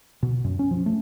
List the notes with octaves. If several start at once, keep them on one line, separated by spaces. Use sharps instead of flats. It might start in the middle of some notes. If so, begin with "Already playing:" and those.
B2
F#2
C#4
F3
A3